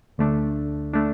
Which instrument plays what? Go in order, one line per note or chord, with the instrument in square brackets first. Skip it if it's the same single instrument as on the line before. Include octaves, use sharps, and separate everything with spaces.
[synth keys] D2 D3 A3 D4
D3 A3 D4